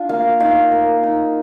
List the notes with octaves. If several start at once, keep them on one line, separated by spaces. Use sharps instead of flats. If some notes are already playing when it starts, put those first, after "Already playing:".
Already playing: D4 F4
A#3 F5
D#4 F5
A#3
D#4